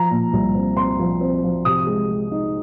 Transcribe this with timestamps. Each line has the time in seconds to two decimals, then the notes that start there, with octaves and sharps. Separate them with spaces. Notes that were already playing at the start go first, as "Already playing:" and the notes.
Already playing: F3 A#5
0.11 A#2
0.33 C2
0.55 C4
0.77 C4 C6
0.99 F3
1.21 C4
1.43 F3
1.65 C3 D#6
1.87 G#3
2.10 G#3
2.32 D#4